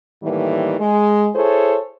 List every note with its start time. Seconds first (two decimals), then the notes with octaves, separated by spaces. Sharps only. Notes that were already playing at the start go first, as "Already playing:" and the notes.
0.23 A2 D#3 E3 G3 A#3
0.80 G#3
1.35 E4 G#4 A4 C5 C#5